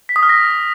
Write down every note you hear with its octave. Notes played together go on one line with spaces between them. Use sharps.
B6
D#6
F6
A#6